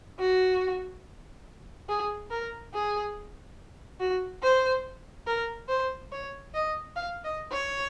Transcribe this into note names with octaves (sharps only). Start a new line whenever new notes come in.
F#4
G#4
A#4
G#4
F#4
C5
A#4
C5
C#5
D#5
F5
D#5
C#5